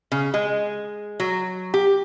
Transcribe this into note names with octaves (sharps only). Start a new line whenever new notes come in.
C#3
G#3
F#3
G4